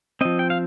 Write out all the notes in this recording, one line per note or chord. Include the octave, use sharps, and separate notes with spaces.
F3 C4 D#5
G5
F5